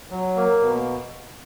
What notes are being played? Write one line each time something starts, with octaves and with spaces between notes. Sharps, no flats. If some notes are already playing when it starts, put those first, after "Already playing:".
F#3
A#3
B2